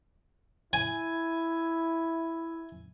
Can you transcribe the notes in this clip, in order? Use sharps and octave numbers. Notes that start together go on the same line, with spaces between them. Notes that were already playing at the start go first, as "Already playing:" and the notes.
E4 G#5